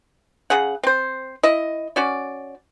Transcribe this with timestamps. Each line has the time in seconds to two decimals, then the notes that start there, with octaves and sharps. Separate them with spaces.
0.50 C#3 G#4 F#5
0.83 C4 C5
1.43 E4 D#5
1.96 C#4 F#4 D5